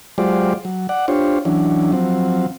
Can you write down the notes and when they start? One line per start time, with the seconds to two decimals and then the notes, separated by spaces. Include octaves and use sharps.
0.18 F#3 G#3 F4 G4 C5 D5
0.65 F#3
0.89 D5 F#5
1.08 D4 F4 G4 C5 C#5
1.45 E3 F#3 C#4 D4
1.92 F3 F#3 C4